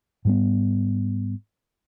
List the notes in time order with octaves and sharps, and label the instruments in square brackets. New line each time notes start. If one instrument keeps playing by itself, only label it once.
[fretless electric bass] G#2 G3 B3